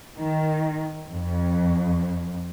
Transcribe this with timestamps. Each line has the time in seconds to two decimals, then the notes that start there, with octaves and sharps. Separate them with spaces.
0.17 D#3
1.08 F2